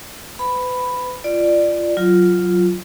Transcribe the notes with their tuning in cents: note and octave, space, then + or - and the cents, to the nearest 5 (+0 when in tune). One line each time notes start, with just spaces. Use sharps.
B4 +35 B5 +5
F4 -20 D5 +15
F#3 +0 F4 +0